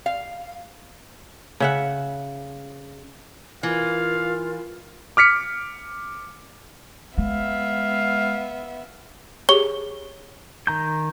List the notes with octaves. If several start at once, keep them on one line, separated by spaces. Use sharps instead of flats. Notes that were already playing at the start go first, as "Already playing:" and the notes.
F5
C#3 E5 F#5
E3 F4 A#4 F5
D6 F6 B6 C#7
G#3 B3 E5 F5
G4 G#4 C#5 G7
D#3 A#5 G6